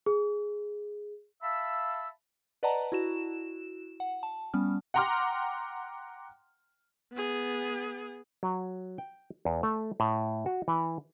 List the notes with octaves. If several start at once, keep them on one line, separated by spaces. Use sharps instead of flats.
G#4
E5 F5 A5 B5 E6
B4 D5 D#5 F#5 A5 A#5
E4 F#4 E7
F#5
A5
G3 B3 C#4 F6
F#5 G5 A#5 C6 D6 F6
B3 G#4
F#3
G5
E2
A3
A2
F#4
E3